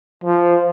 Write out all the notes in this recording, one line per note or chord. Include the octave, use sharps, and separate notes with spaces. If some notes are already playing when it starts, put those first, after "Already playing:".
F3